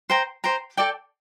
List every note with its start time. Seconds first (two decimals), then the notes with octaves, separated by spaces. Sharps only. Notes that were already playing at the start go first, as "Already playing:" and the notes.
0.10 C5 G5 A#5
0.44 C5 G5 A#5
0.77 A4 D5 G5